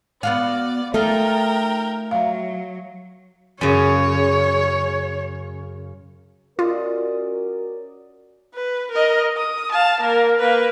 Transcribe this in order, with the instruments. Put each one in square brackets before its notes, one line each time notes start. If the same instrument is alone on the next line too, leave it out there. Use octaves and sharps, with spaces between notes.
[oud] B3 F#4 F5 [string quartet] D5
[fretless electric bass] A3 [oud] D#4 F4 A4 [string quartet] A#4 G5
[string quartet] F#3 [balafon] E5 F5
[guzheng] F#2 C#3 [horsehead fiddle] C#5
[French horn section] C#4 F#4 A#4 [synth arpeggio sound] F4 [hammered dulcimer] D5 D#5
[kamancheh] B4
A#4 D#5
D#6
F5 A5
A#3 A#4
A#3 B4